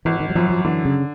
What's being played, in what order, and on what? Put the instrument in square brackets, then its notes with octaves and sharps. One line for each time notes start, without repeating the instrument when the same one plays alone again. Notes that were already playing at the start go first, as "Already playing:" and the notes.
[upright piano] G#1 [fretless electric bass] E3
[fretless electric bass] D#3
F#3
[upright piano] F#2 [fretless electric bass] F3
[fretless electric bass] F3
[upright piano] D3 [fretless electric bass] E3
[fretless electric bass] C#3